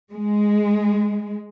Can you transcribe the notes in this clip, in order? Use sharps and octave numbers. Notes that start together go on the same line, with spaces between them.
G#3